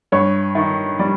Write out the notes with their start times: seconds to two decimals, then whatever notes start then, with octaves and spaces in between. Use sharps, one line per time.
0.12 G2 C#5
0.55 D#3
0.99 G3 D5